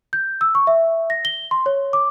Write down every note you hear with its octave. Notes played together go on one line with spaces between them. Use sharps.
G6
E6
C#6
E5
A#6
G7
C6
C#5
D6